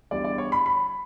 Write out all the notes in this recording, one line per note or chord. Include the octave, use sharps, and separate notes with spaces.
E2 D3 G3 D5
D5
C#5
B5
B5